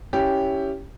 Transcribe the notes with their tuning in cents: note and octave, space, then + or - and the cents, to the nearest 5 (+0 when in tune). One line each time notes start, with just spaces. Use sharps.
C#4 +10 E4 +0 G4 +0